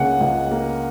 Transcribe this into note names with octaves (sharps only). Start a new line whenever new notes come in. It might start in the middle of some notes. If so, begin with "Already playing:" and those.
Already playing: C#2 C#3 A#3 F#5 G#5
C#2
A#3